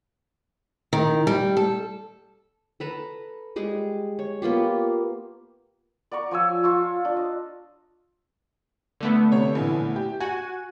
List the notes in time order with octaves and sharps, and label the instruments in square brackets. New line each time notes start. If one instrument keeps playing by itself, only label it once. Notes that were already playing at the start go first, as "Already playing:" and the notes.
[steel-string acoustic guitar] D#3
G3
A4
[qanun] A4 B4 A#5
G3 G#3 G#4
C#5
A#3 B3 F4 G4
[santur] D5 F#5 A#5 C#6
F3 C#5 G#5 E6
F4 A5 C#6 E6
D4
D#5
[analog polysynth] D3 A3 B3
[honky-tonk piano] C3 C#5
A#1 A2 E3
G4
[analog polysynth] F#4 [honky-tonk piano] G#5